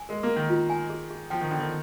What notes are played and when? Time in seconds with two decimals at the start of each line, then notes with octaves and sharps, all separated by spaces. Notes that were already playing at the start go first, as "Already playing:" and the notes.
Already playing: G#5
0.09 G#3 A#4
0.23 A#3
0.30 A#4
0.36 D#3
0.50 F4
0.70 G#5
0.90 G#4
1.11 G#4
1.30 F3 G5
1.41 D#3
1.51 D3 G5
1.60 D#3